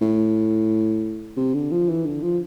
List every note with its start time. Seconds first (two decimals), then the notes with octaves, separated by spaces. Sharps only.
0.01 A2
1.37 C3
1.54 D3
1.72 F3
1.88 E3
2.06 D3
2.23 F3